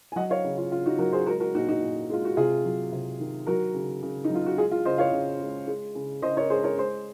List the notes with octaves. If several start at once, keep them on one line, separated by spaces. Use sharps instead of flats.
G#5
F#3 D#5 F#5
C#5 F5
C#3
F4
C#3 F4
D#4 F#4
F#3 F#4 A#4
G#4 C5
G#3 F#4 A#4
F#4 A#4
A#2 D#4 F#4
D#4 F#4
A#2
G#3 F4
F#4
C3 F4 G#4
F#3
C3
D#3
F#3 F#4 A#4
C#3
C#3
D#4
F#3
F4
F#4
G#3 F4 G#4
F4
C#3 C5 D#5
C#5 F5
C#3
G#3
G#3
C#3
C#3 C5 D#5
A#4 C#5
G#3 G#4 C5
A#4 C#5
G#3 G#4 C5